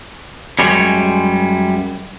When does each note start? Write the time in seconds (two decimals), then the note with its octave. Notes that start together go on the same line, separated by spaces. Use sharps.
0.59 F#2 G3 G#3 C#5